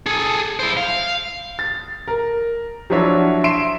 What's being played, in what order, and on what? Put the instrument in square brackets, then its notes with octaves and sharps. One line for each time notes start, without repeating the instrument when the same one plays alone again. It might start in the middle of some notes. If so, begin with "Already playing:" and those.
[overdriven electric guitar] G#4 A4
E4 C5
F5
[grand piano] A6
A#4
F3 F#3 D4 E4 F#4 C#5
E5 C6 C7 D7 E7